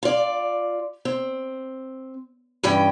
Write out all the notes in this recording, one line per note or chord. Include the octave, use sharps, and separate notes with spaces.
F4 D5
C4
G2 E3 C#4 G5